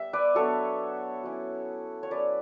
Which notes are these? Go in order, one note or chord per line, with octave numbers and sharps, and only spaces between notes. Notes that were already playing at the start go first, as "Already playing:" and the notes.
Already playing: G3 B3 E5
B4 D5
F#3 B3 D4 A4 C#5
F#3 C#4 E4
C#5
F#3 C#4 E4 B4 D5